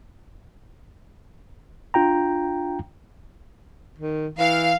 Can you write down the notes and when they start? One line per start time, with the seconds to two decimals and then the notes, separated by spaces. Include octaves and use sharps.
1.94 D4 F4 G5 A#5
3.99 D#3
4.39 E3 F5